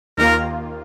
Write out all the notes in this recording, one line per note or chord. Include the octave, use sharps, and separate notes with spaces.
D#2 D#3 A#3 F4 A#4